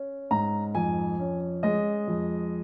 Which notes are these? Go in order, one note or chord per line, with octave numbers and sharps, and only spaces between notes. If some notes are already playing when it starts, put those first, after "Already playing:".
Already playing: C#4
G#2 A#5
F2 G#5
C#4
G#3 D#5
F2